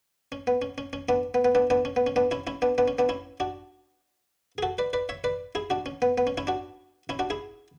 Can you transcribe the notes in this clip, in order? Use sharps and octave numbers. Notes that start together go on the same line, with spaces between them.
C#4
B3
C#4
C#4
C#4
B3 D4
B3
B3
B3 D4
B3 D4
C#4
B3
C#4
B3 D4
C#4 E4
C#4 E4
B3 D4
B3 D4
C#4
B3 D4
C#4 E4
D4 F#4
G#4
F#4 A4
B4 D5
B4 D5
C#5 E5
B4 D5
E4 G#4
D4 F#4
C#4
B3
B3
C#4
C#4 E4
D4 F#4
C#4 E4
D4 F#4
E4 G#4